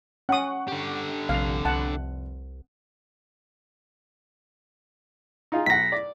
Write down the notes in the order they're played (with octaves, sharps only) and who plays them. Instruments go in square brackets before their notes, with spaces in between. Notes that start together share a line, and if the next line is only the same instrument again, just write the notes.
[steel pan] C#4 D#6 [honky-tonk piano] F#5 C#6
[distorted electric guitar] D3 G4
[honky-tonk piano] F1 F7 [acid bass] A#1 [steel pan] F5
[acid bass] C2 [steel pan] F#5 A5
[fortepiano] D#4 F4 G#4
[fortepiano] B1 F#5 [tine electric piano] A#6 B6
[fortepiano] D5